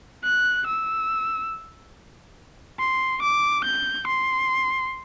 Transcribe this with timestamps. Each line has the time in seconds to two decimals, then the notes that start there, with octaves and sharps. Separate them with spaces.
0.24 F#6
0.67 E6
2.80 C6
3.22 D6
3.65 G6
4.08 C6